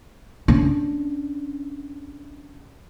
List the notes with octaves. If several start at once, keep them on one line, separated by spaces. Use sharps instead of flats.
C#4 D4